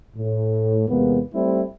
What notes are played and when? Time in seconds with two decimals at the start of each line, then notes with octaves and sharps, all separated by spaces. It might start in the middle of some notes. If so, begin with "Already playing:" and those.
0.15 A2
0.88 E2 C3 G#3 A#3 B3
1.34 G3 A3 C4 E4